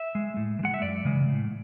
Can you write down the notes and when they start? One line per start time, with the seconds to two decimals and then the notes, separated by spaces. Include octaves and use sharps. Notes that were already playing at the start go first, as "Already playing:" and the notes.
Already playing: E5
0.15 G#3
0.37 A2
0.59 E3
0.63 G#3 F#5
0.74 E5
0.82 F#2 D5
1.05 C#3 E3 G#3
1.28 A2